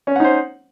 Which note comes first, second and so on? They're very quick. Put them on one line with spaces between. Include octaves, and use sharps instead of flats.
C#4 C#5 F#5 D#4 C5